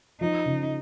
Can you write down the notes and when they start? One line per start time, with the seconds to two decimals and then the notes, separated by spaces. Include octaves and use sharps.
0.21 F3 D#4
0.46 C#3